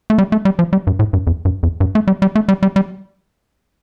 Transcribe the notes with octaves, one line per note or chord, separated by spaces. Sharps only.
A3
G3
A3
G3
F3
G3
G2
A2
G2
F2
G2
F2
G2
A3
G3
G3
A3
G3
G3
G3